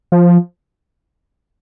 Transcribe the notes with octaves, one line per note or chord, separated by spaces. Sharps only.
F3